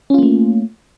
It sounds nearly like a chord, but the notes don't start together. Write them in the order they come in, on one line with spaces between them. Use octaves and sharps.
C#4 F4 A#3 A3